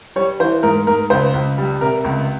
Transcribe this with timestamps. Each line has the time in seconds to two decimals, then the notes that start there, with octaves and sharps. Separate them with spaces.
0.16 G3 C#5
0.40 E3 C5
0.63 G#2 A#4
0.87 G#2 A#4
1.10 C#2 C5
1.34 C#2
1.58 G3
1.81 C3 A#4
2.05 C#2